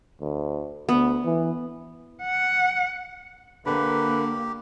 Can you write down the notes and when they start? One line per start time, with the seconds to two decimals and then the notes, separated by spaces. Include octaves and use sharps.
0.20 D2
0.89 D2 B3
1.24 E3
2.24 F#5
3.66 D3 A#3 G4 B4